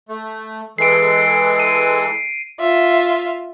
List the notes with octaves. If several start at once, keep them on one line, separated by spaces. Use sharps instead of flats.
A3
E3 G#3 A4 C7 D7
D#7
F4 E5